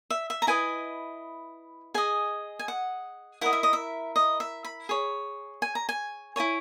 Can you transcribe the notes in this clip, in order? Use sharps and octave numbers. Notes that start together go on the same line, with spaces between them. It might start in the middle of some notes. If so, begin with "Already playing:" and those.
E5
E5
A#5
E4 B4 D#5 G#5
G#4 D#5 G#5
G#5
F#5
E4 A#4 D#5 F#5
E5
D#5
E5
D#5
E5
B5
G#4 C#5
G#5
A#5
G#5
E4 A#4 C#5 G#5